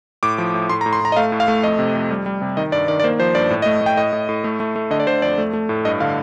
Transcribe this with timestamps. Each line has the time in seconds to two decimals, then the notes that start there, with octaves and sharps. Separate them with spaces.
0.23 A2 D6
0.38 F3
0.54 A2
0.69 A2 C6
0.81 A#5
0.86 A2
0.93 C6
1.01 A2 A#5
1.12 D#5
1.16 A3 F5
1.32 A2
1.40 F5
1.48 A3
1.63 F2 D#5
1.79 C3
1.95 F2
2.10 G3
2.26 G3
2.42 C3
2.57 D#3 D#5
2.72 G2 D5
2.88 D#3 D5
3.00 D5
3.04 A#3 C5
3.19 F3 C5
3.35 G2 D5
3.50 A2
3.62 D#5
3.66 A3
3.81 A3 G5
3.97 A2 D#5
4.13 A2
4.29 A2
4.44 A3
4.60 A3
4.76 A3
4.91 D3 D#5
5.00 D5
5.07 D3 C5
5.22 F2 D5
5.38 A3
5.53 A3
5.69 A2
5.85 G2 D#5
6.00 D3 F5